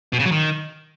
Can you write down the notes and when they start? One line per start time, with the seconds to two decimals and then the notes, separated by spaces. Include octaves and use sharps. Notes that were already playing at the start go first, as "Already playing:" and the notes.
0.13 B2
0.19 C#3
0.26 F#3
0.32 D#3